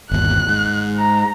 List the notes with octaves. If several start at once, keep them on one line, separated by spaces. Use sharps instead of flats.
G1 D#2 F#6
G#2
A#5